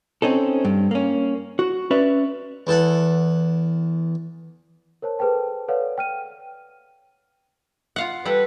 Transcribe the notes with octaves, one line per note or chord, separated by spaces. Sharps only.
C4 C#4 D#4 A4
G2
A#3 C#4
F#4
C#4 B4 D5 E5
E2 A4 F#5
A#4 C5 C#5 A5
G#4 A4 B4 C5 G5 A5
A4 B4 C#5 D5 F5 F#5
G5 F6 D#7
F4 F5 F#5
G3 A4 B4 F#5